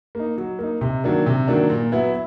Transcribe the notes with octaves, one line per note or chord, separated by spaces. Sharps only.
A#3 D#4
F#3
A#3 D#4
C3
D#3 F#3 A#3 D4
C3
D#3 F#3 A#3 D4
A#2
F#3 B3 E4